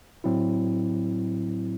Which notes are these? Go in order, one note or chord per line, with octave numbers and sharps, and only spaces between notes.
A2 F#3 C4 E4